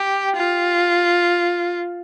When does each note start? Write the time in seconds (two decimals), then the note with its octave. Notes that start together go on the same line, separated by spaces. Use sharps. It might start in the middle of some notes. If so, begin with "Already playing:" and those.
Already playing: G4
0.36 F4